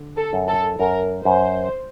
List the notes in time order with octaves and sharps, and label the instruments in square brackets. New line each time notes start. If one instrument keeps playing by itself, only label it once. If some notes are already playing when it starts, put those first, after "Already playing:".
Already playing: [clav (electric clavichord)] D3
[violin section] A4
[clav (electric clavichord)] F#2
[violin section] A4
[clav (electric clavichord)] F#2 [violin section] A#4
[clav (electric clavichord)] F#2 [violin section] C5